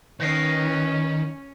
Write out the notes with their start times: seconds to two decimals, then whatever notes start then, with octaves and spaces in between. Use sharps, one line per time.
0.20 D#3 C#4 B4 D#5 F5